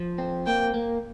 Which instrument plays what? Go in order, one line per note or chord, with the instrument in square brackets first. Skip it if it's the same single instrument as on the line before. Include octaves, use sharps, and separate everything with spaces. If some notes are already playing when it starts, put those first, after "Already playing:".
Already playing: [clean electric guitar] F3
C4
[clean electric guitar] A#3 [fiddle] G5
[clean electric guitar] A#3